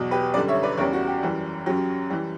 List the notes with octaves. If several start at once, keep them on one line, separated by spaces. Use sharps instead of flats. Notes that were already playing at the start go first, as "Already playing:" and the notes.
Already playing: E2 B2 F#3
G4 B4
F#2 D3 G3 B4 D5
C#5 E5
B4 D5
E2 C#3 G3 A#4 C#5
F#4
G4
F#2 E3 G3
F#2 C#3 F#3 G4
E3 G3